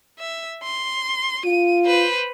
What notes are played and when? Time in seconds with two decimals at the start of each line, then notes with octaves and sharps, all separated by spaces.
0.18 E5
0.63 C6
1.45 F4 D#7
1.87 B4 C5